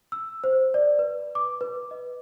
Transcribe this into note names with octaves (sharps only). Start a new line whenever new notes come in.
E6
C5
D5
B4
D6
B4
D#5